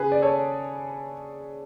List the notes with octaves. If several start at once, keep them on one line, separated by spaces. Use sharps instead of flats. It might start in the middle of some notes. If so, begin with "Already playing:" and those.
Already playing: C#3 G#4 B4
D5
A4 C#5